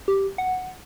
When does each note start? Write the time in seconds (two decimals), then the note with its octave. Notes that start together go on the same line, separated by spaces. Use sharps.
0.08 G4
0.38 F#5